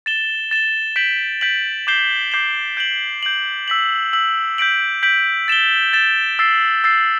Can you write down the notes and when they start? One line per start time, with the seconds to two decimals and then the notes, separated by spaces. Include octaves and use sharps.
0.06 A6 E7 G7
0.51 A6 E7 G7
0.96 G6 B6 D7 F#7
1.41 G6 B6 D7 F#7
1.87 D6 G6 C7 E7 G7
2.31 D6 G6 C7 E7 G7
2.77 G6 D7 F#7
3.23 G6 D7 F#7
3.68 E6 B6 F#7
4.13 E6 B6 F#7
4.58 G6 B6 D7 F#7
5.03 G6 B6 D7 F#7
5.48 A6 E7 G7
5.93 A6 E7 G7
6.39 E6 A6 C7
6.84 E6 A6 C7